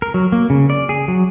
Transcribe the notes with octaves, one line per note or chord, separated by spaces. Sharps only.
A#4
F#3
A#3
C#3
D5
G#4
F#3